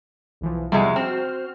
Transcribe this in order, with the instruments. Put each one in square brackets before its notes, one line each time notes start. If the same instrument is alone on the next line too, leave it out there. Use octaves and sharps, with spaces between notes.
[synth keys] B1 E3 F3
[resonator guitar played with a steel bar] E2 C3 G#3 [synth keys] F3 G3
[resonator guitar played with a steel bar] C4 [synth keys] F#4 C5 F6